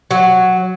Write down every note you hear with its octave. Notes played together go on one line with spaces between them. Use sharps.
F#3